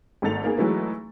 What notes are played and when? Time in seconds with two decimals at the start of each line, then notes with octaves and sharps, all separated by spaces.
0.22 G#1 G#2 A3 A4 A6 F7
0.44 A#3 B3 D#4 G#4
0.57 E3 F#3 G#3 A3 D#4 B4